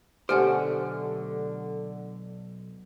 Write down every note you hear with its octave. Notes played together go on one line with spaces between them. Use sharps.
B1 D3 A3 G4 C5 F#5 G#5 F6